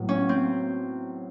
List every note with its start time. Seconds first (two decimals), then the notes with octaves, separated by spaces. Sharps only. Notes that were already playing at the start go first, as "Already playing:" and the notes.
Already playing: A2 F#3 B3
0.09 C#4
0.29 C4